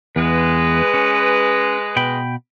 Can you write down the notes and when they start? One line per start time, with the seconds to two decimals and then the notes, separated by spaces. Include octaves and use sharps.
0.16 E2 G#3 B4
0.94 C#4
1.96 B2 G5 B5